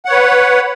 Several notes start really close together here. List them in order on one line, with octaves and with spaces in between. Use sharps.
F#5 C#5 B4